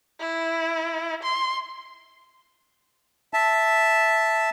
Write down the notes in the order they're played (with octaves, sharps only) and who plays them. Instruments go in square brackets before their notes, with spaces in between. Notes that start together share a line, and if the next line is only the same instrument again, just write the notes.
[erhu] E4
C6
[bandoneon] E5 A5